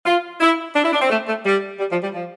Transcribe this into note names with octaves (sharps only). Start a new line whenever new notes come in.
F4
E4
D4
E4
D4
C4
A3
A3
G3
G3
F3
G3
F3